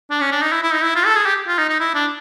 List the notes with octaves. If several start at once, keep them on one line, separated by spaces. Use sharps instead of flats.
D4
C#4
D4
D#4
E4
E4
D#4
E4
F4
A4
G#4
G4
F4
D#4
D#4
E4
D4